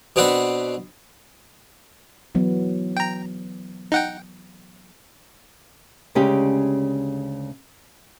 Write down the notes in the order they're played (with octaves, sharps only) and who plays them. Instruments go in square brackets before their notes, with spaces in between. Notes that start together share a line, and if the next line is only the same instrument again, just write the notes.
[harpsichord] B2 B3 C4 D4 F#5 B5
[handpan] E3 F#3 B3
[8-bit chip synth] G5 A#5
D#4 F#5 G5
[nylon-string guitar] D2 C#3 G#3 C#4 G4 C#5